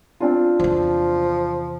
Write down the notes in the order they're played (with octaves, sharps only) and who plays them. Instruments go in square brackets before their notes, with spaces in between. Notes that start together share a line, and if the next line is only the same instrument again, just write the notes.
[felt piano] C4 D4 F4
[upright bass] E2 C3 [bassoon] F3